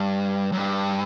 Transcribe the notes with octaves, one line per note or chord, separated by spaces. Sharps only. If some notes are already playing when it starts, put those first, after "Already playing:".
Already playing: G2
F#2
G2